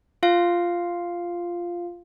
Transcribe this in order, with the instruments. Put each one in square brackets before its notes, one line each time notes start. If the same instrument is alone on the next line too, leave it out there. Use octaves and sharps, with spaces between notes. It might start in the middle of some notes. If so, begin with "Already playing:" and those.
[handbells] F4 F5